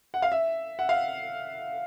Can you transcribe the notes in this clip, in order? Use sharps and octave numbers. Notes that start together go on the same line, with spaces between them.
F#5
F5
E5
F#5
F5